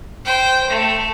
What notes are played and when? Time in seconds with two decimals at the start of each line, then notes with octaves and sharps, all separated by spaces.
0.25 C5 G5
0.69 A3